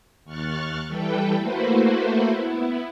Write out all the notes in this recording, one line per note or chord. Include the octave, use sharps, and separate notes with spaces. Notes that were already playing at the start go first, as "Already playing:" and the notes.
D#2 C#6 F6 F#6 A6
E3 G3 A4 B4 G5
A3 A#3 E4 F#4 B4 C5
B3 E4